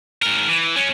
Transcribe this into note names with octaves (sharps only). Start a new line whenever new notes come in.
G#2 A#4
E3
F#3 C#4